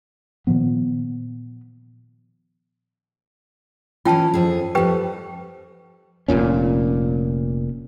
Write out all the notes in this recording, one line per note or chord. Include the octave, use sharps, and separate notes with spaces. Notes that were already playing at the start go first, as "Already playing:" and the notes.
A#2 D#3 F3 B3
E3 C#4 F4 G5 A5
F2 G#4
F2 G3 G4 B4 G5
F1 A#1 A#2 C#4